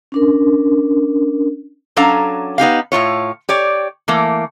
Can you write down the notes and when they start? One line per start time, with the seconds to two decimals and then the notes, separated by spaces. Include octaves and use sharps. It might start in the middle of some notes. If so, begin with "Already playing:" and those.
0.12 C#4 D4 A#4
1.97 F#3 C#4 D4 A4 F5 A#5
2.58 B3 D#4 G4 F5
2.92 A2 F3 F4 C#5
3.49 G4 C#5 D5
4.08 E3 A3 A#3